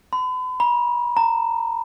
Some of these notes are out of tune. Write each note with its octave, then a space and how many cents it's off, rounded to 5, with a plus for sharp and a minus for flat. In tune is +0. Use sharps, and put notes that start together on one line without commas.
B5 +40
B5 -45
A#5 -25